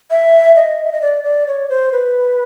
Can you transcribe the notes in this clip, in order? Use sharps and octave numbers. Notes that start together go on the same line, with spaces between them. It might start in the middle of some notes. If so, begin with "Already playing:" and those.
E5
D#5
E5
D#5
D5
D5
C#5
C5
B4